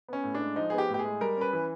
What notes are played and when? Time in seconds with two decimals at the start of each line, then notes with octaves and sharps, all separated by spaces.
0.08 B3 C#4
0.24 A2
0.34 D4
0.41 G#3
0.56 F3 D#4
0.70 B3 G#4
0.78 G4
0.89 A2
0.94 G4
0.99 G#4
1.05 G#3
1.21 G3 A#4
1.37 C#4 B4
1.53 E3